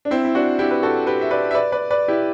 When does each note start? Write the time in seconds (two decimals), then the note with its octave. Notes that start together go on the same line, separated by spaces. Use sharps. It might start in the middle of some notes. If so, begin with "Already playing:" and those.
0.05 D4
0.11 C4 E4
0.25 E4
0.35 D4 F#4
0.59 E4 G4
0.71 B4
0.83 F#4 A4
1.07 G4 B4
1.21 E5
1.31 B4 D5
1.51 E5
1.55 B4 D5
1.72 B4 D5
1.90 B4 D5
2.08 E4 G4